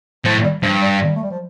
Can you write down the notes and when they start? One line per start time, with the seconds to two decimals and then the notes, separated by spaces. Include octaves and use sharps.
0.25 A2 F3
0.43 G3
0.63 G2 F3
0.82 G3
1.01 G3
1.16 A3
1.23 G3
1.31 F3